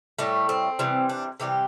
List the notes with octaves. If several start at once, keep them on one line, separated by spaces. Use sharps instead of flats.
A2 G3 A3
C4
C3 E3 G3
D4
C3 E3 G3 G4